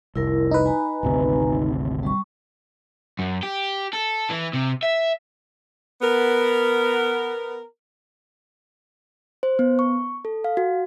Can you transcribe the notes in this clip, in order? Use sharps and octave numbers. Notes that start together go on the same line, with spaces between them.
F1 C2 E4 A#4
D#4 B4
G#5 A#5
G#1 D2 C3
G3 C#6
F#2
G4
A4
E3
C3
E5
B3 A#4
C5
B3
C#6
A4
F5
F#4